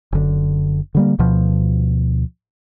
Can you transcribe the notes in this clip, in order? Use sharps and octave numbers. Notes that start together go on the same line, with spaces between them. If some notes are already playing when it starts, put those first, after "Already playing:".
F#1 D3
D3 G3 A#3
D2 B2 F3